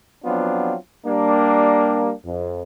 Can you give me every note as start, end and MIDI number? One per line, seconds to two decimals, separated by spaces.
0.25 0.74 53
0.25 0.74 54
0.25 0.74 59
0.25 0.74 60
0.25 0.74 62
0.25 0.74 65
1.06 2.12 55
1.06 2.12 58
1.06 2.12 62
2.25 2.63 41